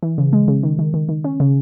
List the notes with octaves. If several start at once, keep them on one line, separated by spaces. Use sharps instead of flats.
E3
C#3
G#3
C#3
D#3
D#3
D#3
D#3
C#4
C#3